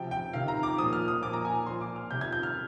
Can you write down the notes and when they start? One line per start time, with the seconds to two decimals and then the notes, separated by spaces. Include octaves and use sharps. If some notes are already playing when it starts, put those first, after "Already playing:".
Already playing: C3 F3 G5
0.11 G5
0.33 C3 D#3 F5
0.48 A#5
0.63 D6
0.78 A#2 F3 D#6
0.93 F6
1.08 D#6
1.22 A#2 F3 D6
1.33 A#5
1.45 G#5
1.66 A#2 F3 C6
1.81 D6
1.96 F6
2.11 C3 D#3 G6
2.21 G#6
2.33 G6
2.43 F6